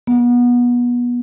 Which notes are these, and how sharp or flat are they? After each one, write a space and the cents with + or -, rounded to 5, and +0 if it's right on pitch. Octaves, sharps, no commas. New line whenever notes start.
B3 -25